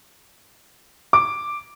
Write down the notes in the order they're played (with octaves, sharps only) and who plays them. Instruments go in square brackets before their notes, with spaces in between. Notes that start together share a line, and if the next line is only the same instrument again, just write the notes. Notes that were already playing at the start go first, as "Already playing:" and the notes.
[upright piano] D6